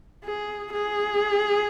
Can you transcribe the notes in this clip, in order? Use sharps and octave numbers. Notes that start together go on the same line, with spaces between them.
G#4
G#4